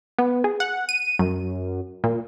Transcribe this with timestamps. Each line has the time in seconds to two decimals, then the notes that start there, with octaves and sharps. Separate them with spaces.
0.19 B3
0.44 G#4
0.60 F#5
0.89 D#7
1.19 F#2
2.04 A#2